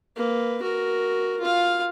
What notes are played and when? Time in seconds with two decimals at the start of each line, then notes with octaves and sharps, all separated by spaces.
0.16 A#3 B4
0.62 F#4 A#4
1.41 F4 F5